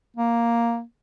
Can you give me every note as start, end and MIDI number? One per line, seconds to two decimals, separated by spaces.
0.17 0.82 58